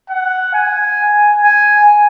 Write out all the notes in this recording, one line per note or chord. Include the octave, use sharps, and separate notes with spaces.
F#5
G#5
G#5